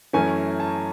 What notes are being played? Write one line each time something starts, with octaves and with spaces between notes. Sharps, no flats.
F#2 E3 A3 C#4 G#5
A5